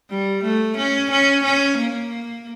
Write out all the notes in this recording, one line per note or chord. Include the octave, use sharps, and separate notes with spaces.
G3
A3
C#4
C#4
C#4
A#3